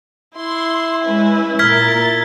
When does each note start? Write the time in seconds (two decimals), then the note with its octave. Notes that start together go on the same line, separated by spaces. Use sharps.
0.37 E4 C6
1.04 G#3 C#4 B4
1.59 A#2 A#4 F6 G#6 A6 B6